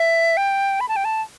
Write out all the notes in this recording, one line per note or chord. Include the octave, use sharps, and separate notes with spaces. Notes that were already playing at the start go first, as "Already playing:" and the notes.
Already playing: E5
G5
B5
A5
G5
A5